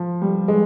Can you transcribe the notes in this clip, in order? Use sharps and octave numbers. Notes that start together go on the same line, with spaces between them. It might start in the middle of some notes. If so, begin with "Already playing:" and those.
Already playing: F3
G3
G#3